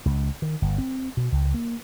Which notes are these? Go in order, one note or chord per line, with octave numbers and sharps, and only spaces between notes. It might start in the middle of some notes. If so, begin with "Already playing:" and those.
C#2
D#3
G1
C4
B2
C#2
A#3